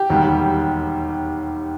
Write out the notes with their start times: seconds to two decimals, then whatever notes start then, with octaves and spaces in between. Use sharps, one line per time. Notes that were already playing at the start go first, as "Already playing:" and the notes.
Already playing: G4
0.09 E1 D#2 D#3 G3